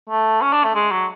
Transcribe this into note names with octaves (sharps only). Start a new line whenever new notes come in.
A3
C#4
D4
A3
G#3
F#3